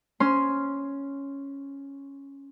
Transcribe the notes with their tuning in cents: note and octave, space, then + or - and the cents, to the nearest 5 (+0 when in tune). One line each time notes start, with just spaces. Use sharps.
C#4 +0 C6 +0